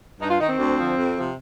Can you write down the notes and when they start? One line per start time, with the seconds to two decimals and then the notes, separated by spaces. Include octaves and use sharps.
0.21 G2 D#4
0.30 F4
0.40 D#3 D#4
0.49 C4
0.59 D2
0.78 D3 F3
0.97 F2
1.16 C3 F3